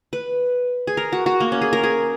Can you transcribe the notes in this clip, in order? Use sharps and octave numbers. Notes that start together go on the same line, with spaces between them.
B4
G#4
A#4
F#4
F#4
A#3
C#4
G#4
A#4
G#4